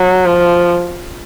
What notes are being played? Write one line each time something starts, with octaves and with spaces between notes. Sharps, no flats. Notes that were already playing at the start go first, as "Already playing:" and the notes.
Already playing: F#3
F3